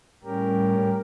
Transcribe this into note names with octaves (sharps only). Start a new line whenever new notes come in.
A2 G3 C#4 G4 A#4